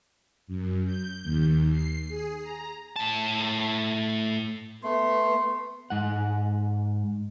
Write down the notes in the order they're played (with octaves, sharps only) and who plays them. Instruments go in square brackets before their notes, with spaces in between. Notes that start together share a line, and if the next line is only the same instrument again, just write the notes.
[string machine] F#2
G6
D#2
C7
G#4
A#5
[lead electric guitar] A2 A5
[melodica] A3 [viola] B3 [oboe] C6
[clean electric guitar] G#2 F#5